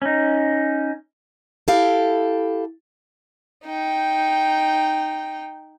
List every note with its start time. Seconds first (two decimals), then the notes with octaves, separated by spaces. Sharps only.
0.02 C#4 D#4
1.68 E4 G4 A4 F5
3.65 D#4 G5